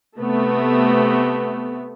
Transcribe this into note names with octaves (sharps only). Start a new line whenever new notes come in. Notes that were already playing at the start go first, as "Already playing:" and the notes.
C3 A3 B3